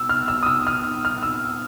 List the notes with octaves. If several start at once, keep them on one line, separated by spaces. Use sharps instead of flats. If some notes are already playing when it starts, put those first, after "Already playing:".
Already playing: B2 E6
F6
E6
D#6
E6
F6
F6
E6